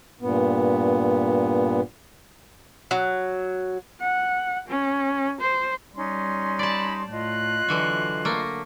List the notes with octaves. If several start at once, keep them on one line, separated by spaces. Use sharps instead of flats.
G2 A#2 B3
F#3
F#5
C#4
C5
G3 C#4 D#4 C6
D5 A5 B5
A2 F4 D#5 F#6
D3 E3 F#3 F#4
A3 A#3